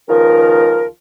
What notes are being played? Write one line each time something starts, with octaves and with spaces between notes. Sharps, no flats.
C#2 D#3 F3 A#4